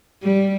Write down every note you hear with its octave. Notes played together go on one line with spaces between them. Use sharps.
G3